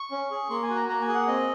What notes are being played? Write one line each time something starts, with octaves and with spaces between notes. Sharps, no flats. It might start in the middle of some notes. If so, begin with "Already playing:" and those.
Already playing: C#6
C#4
G#4
A#3 C6
G#5
F#4
A#5
A#3 A#5
G#5
G#4
F#5
C4 D#5